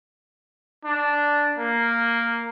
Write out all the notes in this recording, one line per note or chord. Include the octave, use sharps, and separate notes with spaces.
D4
A#3